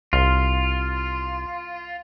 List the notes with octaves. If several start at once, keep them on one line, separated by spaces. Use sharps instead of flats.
C2 F4